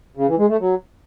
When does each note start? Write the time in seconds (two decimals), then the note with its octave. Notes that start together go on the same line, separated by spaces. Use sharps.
0.17 C#3
0.28 E3
0.38 G#3
0.49 A3
0.60 F#3